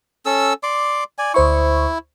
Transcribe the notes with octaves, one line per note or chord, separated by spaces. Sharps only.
C#4 A4 E6
D5 C6 D6
D5 G#5
D2 E4 C5 C#6